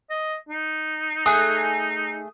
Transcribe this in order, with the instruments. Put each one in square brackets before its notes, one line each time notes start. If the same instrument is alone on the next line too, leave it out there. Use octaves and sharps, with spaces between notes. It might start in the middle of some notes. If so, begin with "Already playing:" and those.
[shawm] D#5
D#4
[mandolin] A3 G#4 F#6 [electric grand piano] D#6